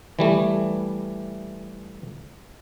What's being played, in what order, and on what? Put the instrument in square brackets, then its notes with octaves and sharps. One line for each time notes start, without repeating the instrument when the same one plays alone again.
[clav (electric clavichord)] E3 G3 A3